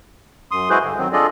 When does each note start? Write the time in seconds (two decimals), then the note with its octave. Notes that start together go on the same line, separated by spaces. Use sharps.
0.51 F#2 C6 D#6
0.70 G#3 E4 F#4 G#4 B4 C5
0.83 G2 D3
0.98 D#3 F#3 C4
1.13 D4 F4 G#4 A4 D5 D#5